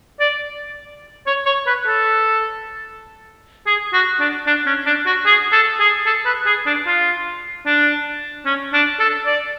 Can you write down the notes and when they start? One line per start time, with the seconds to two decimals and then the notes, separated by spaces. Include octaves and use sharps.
0.20 D5
1.27 C#5
1.46 C#5
1.67 B4
1.87 A4
3.66 G#4
3.93 F#4
4.20 D4
4.47 D4
4.66 C#4
4.86 D4
5.06 F#4
5.26 G#4
5.53 A4
5.80 G#4
6.06 A4
6.26 B4
6.46 G#4
6.66 D4
6.87 F4
7.66 D4
8.46 C#4
8.73 D4
9.00 A4
9.26 D5